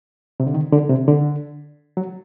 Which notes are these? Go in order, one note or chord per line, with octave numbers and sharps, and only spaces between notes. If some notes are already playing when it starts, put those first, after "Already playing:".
C3
D3
D#3
D3
C3
D3
F#3